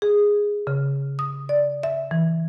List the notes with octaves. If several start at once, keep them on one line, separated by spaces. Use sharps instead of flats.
G#4
C#3
D#6
D5
E5
E3